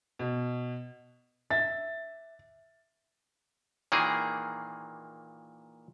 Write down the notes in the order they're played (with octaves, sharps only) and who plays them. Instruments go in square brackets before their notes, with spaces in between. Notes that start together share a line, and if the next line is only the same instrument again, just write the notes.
[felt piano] B2
[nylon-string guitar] E5 [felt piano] A6
[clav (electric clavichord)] A#2 D#3 E3 A#3 G#4